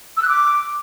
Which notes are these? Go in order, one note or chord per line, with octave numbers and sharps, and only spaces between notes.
E6
F#6
D6